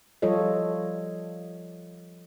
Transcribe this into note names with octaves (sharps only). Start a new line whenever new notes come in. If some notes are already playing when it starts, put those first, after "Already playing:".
F3 G3 F4 A4 C#5 D#5